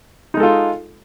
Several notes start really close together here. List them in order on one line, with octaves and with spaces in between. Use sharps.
D#4 G#3 A4 F4